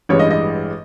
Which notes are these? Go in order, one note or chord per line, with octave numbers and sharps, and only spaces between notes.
A1 G2 E3 G#3 C#5
D#5
D#5